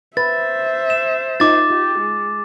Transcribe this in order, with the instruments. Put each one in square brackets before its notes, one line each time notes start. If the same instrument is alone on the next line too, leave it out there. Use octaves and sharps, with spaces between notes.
[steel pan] B4 [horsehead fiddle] C5 E5 [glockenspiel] A6
[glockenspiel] E7
[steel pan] D#4 F4 [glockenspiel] D6 A6
[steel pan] F4 [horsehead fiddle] G4
[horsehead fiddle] G#3